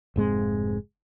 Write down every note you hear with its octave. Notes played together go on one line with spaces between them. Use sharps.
F1 G#2 G#3 C4